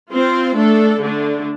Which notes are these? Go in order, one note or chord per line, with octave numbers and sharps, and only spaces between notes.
C4 F4 C5
A3 D4 A4
D3 A3 D4